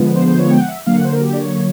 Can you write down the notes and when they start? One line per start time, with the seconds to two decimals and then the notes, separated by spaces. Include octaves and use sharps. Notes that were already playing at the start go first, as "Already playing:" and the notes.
Already playing: D3 F3 G#3 B3
0.15 C5
0.27 C5
0.39 C#5
0.51 G5
0.60 F#5
0.68 E5
0.86 D3 F#3 A#3 F5
0.95 F#5
1.04 C5
1.12 A#4
1.21 G4
1.33 D5
1.39 C#5